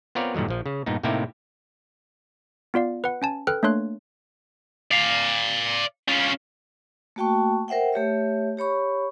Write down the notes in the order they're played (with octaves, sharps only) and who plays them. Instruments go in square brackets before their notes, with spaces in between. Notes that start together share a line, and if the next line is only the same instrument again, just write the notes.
[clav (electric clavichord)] B3 C4 F4 A#4 C#5 D5
G2 A#2 D3 D#3 F#3
A#1 F3
C#3
G2 A#2 B3 D#4
A2 C3 A#3 D#4 E4 G4
[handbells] B3 F4 D5 F5
B4 F#5
C#4 G#5 A5
A4 B4 G5 F6 F#6
A3 A#3 D4 C#5 C6 F#6
[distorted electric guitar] D5 F5
C#4 F4
[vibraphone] A3 A#3 F#4 G5 A5 C#6
A#4 C5 E5 F#5 G5
A3 G4 C#5 E5
G4 C#5 B5 C#6